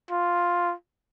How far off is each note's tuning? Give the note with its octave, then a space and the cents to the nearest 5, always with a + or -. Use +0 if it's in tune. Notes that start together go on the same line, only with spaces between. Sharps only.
F4 +5